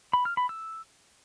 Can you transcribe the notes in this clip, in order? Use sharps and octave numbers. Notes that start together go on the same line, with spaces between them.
B5
F6
B5
E6